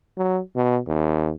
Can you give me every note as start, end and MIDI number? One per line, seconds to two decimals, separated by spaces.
0.17 0.41 54
0.56 0.79 47
0.87 1.32 39